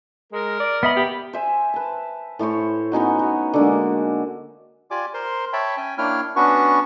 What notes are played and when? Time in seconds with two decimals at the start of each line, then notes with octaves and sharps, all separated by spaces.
0.32 G#3 A#4
0.60 D5
0.83 B3 D#5 E5 B5
0.96 G4
1.33 C5 E5 G#5
1.74 B4 A5
2.39 A2 E4 C5 C#5
2.92 B3 C#4 D#4 F#4
3.19 F#4
3.53 D3 G#3 A#3
4.91 F4 G4 D5 G#5 D6
5.14 A#4 C5 C6
5.53 C#5 E5 G5 A5 B5
5.77 C#4 G5 G#5
5.98 A#3 D4 E4 C#5 G5 F6
6.36 B3 C#4 D4 F#4 B4 C#6